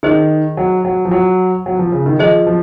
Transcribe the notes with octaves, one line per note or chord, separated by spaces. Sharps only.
D#3 D#4 G#4 C5 D#5
F#3
F#3
F3
F#3
F#3
F3
C#3
D#3
F3 G#4 C5 D#5
F3